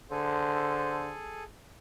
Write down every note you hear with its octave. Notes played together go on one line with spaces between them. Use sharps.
D3 G#4 A4 C5